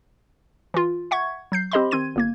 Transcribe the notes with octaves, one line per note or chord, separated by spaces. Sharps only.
E3 F4
E5 F#5 C#6 G#6
F#3 G6 C7
C4 G4 C5 D#5 B5 C6
D#3 C4 C6 G#6 D#7
G1 A#3 G#6